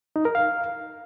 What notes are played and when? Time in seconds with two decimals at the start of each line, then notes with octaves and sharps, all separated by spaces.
0.16 D#4
0.25 A#4
0.35 F5